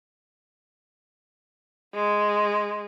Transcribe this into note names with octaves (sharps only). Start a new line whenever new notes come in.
G#3